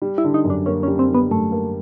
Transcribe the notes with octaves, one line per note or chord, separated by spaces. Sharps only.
G3
E4
D3
D#4
F#2
D4
A#3 C#4
C#4
G3
C4
D3 B3
F#2 A3
A#3